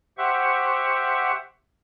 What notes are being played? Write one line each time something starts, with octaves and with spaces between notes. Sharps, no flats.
G4 C5 E5 F#5 C#6